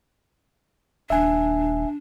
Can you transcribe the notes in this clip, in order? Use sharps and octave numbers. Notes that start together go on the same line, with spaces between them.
D#1 D4 E5 G#5